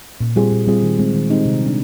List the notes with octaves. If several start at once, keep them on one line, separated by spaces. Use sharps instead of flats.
A#2
G3 C4 F4 G#4
A#2
G3 C4 F4 G#4
D#3
G#3 C4 D#4 G4
D#3
G#3 C4 D#4 G4
C3
G3
D4